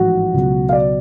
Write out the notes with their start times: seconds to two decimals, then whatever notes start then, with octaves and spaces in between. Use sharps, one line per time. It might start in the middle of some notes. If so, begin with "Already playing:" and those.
Already playing: A1 G#2 F3 G#3 F#4
0.34 C#2 B2 F#3
0.69 F5
0.73 D5